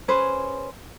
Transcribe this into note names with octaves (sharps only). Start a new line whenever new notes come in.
C#4 G#4 B4 C5